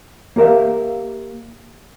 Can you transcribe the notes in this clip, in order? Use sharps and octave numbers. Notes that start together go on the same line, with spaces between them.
A#3 G4 A#4 E5 F5